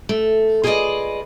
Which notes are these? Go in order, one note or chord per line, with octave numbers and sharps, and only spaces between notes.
A3
F4 G#4 B4 C5 D5 D#5